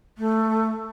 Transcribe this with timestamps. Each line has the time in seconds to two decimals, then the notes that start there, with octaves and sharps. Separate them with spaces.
0.18 A3